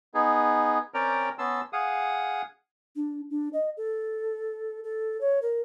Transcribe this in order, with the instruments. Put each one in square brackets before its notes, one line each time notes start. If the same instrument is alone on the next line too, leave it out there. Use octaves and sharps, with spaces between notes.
[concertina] B3 D#4 G#4
C4 C#4 A#4 D5 G5 A#5
B3 C#4 A5 C6 E6
G#4 F5 F#5 D#6
[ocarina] D4
D4
D#5
A4
A4
C#5
A#4